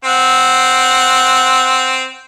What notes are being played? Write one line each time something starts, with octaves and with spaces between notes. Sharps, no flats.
C4 F#5